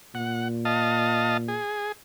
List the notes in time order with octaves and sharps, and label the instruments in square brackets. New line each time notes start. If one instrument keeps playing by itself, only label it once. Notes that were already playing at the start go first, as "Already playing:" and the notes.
[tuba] A#2 [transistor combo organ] F#5
[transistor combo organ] D#5 F5 A5
G#4